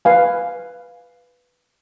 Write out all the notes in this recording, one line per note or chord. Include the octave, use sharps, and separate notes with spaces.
B4 F5 G#5